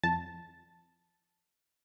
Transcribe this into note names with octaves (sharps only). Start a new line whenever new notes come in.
F2 A5